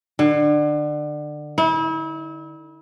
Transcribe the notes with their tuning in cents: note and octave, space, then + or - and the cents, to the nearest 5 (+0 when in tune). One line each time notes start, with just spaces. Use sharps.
D3 +25
E4 -35